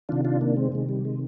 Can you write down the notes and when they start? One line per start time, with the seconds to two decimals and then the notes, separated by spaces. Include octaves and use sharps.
0.09 C3 D#3 D4 F4
0.25 D4 F4
0.41 A#3 D4
0.56 G#3 C4
0.72 C3 D#3 G#3
0.89 G3
1.05 G#3